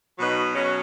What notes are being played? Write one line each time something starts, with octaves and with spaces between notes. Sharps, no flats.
B2 F#3 D#4 B4
B2 F#3 C#4 F#4